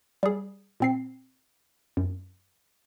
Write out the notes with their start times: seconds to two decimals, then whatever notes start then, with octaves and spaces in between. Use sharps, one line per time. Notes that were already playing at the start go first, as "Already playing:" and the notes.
0.23 G3 G#4
0.80 A#2 C4 C7
1.97 F#2